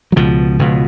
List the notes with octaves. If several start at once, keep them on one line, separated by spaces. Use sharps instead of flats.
F#3
C#2 B2 F3
C#2 B2